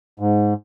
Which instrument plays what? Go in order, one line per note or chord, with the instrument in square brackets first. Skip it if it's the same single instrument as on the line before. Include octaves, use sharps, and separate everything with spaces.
[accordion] G#2